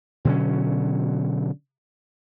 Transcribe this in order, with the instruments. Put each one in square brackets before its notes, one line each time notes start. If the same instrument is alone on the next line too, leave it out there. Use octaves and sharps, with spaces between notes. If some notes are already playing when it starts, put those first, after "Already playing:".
[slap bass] B2 D3 F#3 C#4